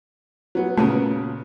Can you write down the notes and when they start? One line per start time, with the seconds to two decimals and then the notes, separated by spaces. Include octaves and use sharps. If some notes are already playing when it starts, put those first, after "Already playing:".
0.55 F#3 B3
0.77 A#2 C#3 A3 B3